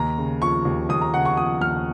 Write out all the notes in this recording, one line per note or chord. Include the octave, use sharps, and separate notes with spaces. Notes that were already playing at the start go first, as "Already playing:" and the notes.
Already playing: D#2 A#5
C#3
F3 C#6
D#2
D#2 D#6
A#5
C#3 F#5
C#6
F3 D#6
D#2 F6